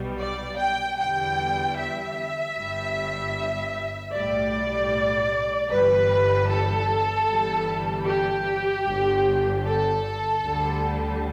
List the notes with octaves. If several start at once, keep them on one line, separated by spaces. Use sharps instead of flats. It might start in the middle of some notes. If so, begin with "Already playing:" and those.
Already playing: B1 B2 G3
D5
G5
E2 D3 G3 G5
E5
G1 G2 G3
B1 A2 G3 D5
G1 G2 E3 G3 B4
A4
G1 G2 E3 G3
G4
G1 G2 D3
A4
D2 D3 G3